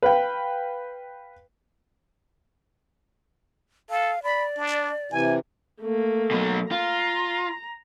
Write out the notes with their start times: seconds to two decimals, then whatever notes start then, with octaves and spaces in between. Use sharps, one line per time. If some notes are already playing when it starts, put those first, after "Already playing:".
0.03 B4 F5 G5
3.90 A4 F5
4.23 D5 B5
4.58 D4
5.12 C3 E3 G#5
5.81 A3 A#3
6.31 B2 F#3
6.71 F4 A#5